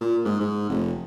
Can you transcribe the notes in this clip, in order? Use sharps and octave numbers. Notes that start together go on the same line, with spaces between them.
A#2
G#2
G#2
F1